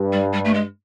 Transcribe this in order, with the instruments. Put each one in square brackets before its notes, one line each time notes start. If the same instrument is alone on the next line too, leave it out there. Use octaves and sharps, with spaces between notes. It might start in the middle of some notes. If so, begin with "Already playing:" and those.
Already playing: [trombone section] G2
[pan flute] G3
G3
A3
G#3